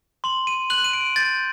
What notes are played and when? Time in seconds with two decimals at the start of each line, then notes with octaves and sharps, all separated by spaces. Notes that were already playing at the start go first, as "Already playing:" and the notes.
0.24 C6 F#7
0.47 D#7
0.70 F#6 F#7
0.84 D#7
0.93 D7
1.16 G6 A6